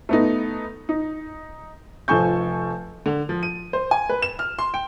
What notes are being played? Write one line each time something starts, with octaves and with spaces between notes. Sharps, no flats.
A3 B3 D#4
D#4
F1 F3 A4 G#5 C#6 G6
D3
F3
D#7
C5
G#5
B4
E7
F6
C6
G5